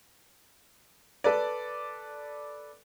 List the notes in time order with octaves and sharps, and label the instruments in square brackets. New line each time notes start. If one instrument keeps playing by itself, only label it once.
[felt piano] A4 B4 D5